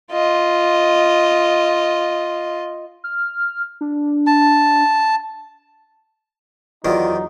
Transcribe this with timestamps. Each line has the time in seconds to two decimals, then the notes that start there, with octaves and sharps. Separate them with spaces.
0.11 F4 D#5
3.04 F6
3.81 D4
4.27 A5
6.85 E2 D#3 F#3 D#4 F4 D5